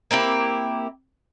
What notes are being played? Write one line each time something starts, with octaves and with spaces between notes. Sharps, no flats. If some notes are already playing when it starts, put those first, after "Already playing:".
A#3 C4 E4 G4